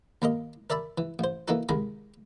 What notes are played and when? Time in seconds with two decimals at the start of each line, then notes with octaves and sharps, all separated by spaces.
0.22 D#2 A#3 A#4 D#5
0.70 A#4 D5 E5 A5 B5
0.98 E3
1.19 A1 C5
1.48 E3 A#3 D#4 F#4 A4
1.69 C2 D#3 G#3 A#5 B5